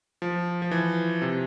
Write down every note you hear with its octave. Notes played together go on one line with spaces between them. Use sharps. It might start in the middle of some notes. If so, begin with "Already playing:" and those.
F3
F3
E3
C3